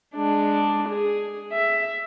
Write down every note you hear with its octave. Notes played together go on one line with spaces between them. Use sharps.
G#3 D4
G#4
E5